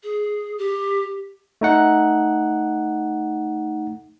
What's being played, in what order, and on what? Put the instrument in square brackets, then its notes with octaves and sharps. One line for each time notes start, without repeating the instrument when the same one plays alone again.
[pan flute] G#4
G4
[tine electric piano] A3 D#4 F#5